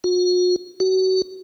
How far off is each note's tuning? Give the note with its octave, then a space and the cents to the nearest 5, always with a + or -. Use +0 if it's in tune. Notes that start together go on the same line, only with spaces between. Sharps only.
F#4 -45
F#4 +30